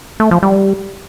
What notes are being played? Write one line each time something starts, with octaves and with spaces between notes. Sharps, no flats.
A3
F3
G3